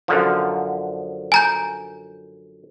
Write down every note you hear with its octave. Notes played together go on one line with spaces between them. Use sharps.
F#2 D3 F3
G#5 A#5 G6